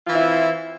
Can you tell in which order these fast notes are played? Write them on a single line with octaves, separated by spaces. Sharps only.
F4 E3 C4 E4